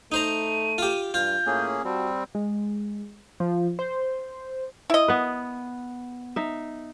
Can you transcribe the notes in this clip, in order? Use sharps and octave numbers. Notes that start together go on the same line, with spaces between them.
A3 D#4 C5 A#5 D#7
F4 G4
G2 F4 G6
A2 A#3 C#4 G#4
G3 C4 F#4 A5
G#3
F3
C5
E4 D#5
B3 B4
D#4 E5